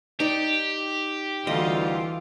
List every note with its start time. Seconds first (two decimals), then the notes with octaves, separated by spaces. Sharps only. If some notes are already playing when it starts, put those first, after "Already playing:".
0.20 D#4 G4 D5
1.47 D2 E3 G3 F4 D#5